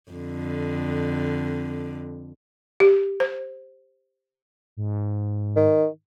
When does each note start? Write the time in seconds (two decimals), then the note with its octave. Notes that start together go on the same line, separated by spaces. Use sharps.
0.12 F2 D3
2.80 G4
3.20 C5
4.77 G#2
5.56 D#3